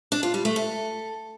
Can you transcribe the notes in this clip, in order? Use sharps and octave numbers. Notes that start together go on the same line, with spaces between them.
D4
F4
G3
A3
A4